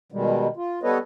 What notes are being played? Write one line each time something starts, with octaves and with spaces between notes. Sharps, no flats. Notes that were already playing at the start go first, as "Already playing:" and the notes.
B2 D#3 G3 G#3
F4
G3 B3 A4 B4 C#5 D#5